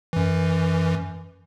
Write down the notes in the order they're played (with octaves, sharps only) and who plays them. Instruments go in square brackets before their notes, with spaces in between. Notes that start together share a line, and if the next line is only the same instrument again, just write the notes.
[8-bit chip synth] F#2 E3